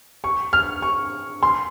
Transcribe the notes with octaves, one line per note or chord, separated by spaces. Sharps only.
C#6
F6
C#6
C6